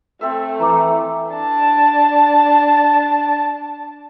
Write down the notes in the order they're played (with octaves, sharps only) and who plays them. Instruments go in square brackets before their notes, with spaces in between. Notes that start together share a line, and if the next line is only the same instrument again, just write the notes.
[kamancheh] A3 [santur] C4 A4 E5
[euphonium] E3 [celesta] A#5 D6
[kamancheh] D4 A5